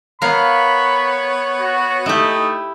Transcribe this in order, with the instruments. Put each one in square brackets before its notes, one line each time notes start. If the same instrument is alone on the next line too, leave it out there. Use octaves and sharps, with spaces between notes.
[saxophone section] B3 C#5 [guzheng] A#4 F5 [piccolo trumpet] B5
[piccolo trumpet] F#4
[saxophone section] A3 D#4 [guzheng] E4 G4 [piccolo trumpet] D#6